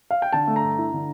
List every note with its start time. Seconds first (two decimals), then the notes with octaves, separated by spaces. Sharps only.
0.11 F5
0.22 G5
0.33 D3 A5
0.47 A3
0.56 A#5
0.63 G2
0.78 E4
0.93 D3